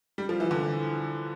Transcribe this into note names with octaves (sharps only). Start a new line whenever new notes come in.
G3
F3
E3
D3